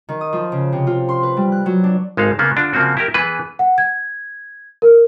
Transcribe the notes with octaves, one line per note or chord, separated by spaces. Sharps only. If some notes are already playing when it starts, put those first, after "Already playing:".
D#3
D#6
F3
C#3
C3
F4
C6
B4
G3
F#6
F#3
D4
G#1 G#3 A4 F5
C#3 A#3 B3
D3 D4 F4
C#3 F3 A#3 C4 F#4
E4 G4 A#4
E3 B3 G#4 B4
F#5
G#6
A#4